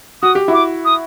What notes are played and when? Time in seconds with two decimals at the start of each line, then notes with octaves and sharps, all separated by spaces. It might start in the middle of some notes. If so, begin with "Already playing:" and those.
0.22 F#4 D#6
0.35 G4
0.48 E4 F#4
0.53 D6
0.85 D#6